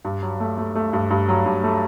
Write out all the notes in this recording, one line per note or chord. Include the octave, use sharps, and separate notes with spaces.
G2
F#3
A3
A3
A3
G2
G2
F#3
G2
A3